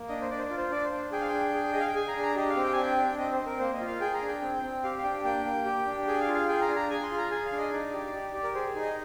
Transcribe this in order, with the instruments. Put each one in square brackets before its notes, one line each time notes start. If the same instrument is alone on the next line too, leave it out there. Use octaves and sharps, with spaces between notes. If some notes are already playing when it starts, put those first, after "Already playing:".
Already playing: [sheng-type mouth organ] A#3
D4 D#5
C5
D4 D5
C5
D5
F4
C5
D4 D5
C5
D4
G#4 G5
F5
D4 G5
G#4
G#4 D#5
F5
G5
G#4 G#5
A#5
D4
A#5
G4 D#5
F5
C4
G5
G#5
D4
G5
D4
C4 D#5
C5
C4
A#4
A#3 C5
D#5
F4
F5
G#4 G5
A#5
D4
G5
C4
C4
G4 F5
F5
D4 G5
A#3 G5
A#3
G4
D4
G#4 G5
F5
F4
F5
G#4 G5
A#5
D4
A#5
G#4 G#5
C6
F4
A#5
G#4 G#5
F5
D4
D#5
D#4 D5
G4
G4
G4
A#4
G#4 C5
D#4
D#5